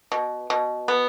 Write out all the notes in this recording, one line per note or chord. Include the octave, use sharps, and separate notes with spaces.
B2
B2
B3